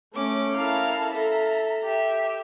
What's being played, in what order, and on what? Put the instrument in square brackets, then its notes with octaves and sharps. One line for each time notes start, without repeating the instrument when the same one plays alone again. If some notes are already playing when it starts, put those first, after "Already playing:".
[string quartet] A3 [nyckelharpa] C#4 D6
[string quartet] E4 A4 A#4 [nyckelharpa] F5
[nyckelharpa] A4 [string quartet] E5 A#5
[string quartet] G4 E5